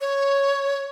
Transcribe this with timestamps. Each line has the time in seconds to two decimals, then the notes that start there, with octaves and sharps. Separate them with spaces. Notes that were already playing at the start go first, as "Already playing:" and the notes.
0.01 C#5